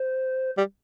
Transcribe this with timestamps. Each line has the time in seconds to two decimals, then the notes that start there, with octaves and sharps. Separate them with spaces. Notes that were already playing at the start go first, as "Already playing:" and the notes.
Already playing: C5
0.58 G3